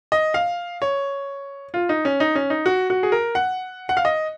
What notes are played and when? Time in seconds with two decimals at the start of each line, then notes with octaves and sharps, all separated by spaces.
0.12 D#5
0.34 F5
0.82 C#5
1.74 F4
1.89 D#4
2.05 C#4
2.20 D#4
2.35 C#4
2.50 D#4
2.66 F#4
2.90 F#4
3.03 G#4
3.12 A#4
3.35 F#5
3.89 F#5
3.97 F5
4.05 D#5